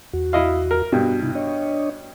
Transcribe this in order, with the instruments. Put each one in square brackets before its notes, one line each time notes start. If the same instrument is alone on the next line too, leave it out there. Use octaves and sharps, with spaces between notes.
[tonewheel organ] E2 F#4
[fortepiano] E4 D#5 F5
A#4
[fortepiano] G2 B2 [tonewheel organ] G3 F#4
[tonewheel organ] C3 D#4 E4
D4 C#5 D#5